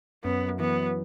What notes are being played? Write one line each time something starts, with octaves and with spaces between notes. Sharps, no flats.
F#2 B3
E3 B3